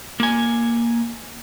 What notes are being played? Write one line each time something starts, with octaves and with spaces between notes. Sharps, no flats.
A#3 G#5